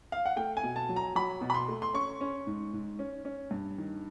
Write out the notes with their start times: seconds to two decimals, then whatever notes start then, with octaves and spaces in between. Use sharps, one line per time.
0.12 F5
0.26 F#5
0.36 A3 G5
0.57 G#5
0.63 B2
0.76 A5
0.89 F#3
0.96 A#5
1.15 F#3 B5
1.41 B2
1.50 B5
1.54 C6
1.68 A3
1.82 C6
1.94 C#4 C#6
2.21 C#4
2.47 G#2
2.73 G#2
2.99 C#4
3.25 C#4
3.51 G2
3.78 D#3